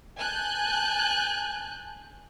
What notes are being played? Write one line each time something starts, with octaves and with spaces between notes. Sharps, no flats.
G#5 A5 F#6 G6